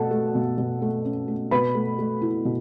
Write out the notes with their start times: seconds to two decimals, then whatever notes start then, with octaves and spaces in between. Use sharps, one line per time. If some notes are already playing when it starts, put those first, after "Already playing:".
Already playing: B2 A3 A4 F#5 A5
0.11 A3
0.35 B2
0.58 B2
0.82 A3
1.05 C#4
1.28 A3
1.51 B2 B4 B5
1.75 A3
1.99 A3
2.22 E4
2.45 B2